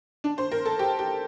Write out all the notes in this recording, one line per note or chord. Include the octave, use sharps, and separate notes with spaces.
D4
C5
A#4
A4
G4
G4